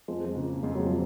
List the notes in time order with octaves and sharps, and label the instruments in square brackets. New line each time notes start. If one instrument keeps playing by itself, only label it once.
[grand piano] F2 [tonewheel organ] F3 G#3
[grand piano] C#3 F3 A#3
[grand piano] F2 [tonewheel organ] G#3
[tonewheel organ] F#3
[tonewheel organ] F3 [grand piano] A#3